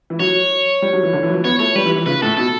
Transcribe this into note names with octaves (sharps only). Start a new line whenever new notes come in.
E3
F#3 C#5
G3
F#3
E3
D3
E3
F#3
E3
B3 C#5
A3 C#5
G3 B4
E3
E3
C#3 B4
A2 A4
B2 A4